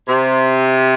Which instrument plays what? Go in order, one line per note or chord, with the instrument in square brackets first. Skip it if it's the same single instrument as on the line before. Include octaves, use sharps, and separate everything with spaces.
[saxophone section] C3